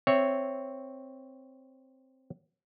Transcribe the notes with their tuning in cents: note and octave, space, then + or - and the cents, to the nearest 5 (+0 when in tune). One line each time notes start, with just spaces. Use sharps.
C4 +0 C#5 +0 E5 +0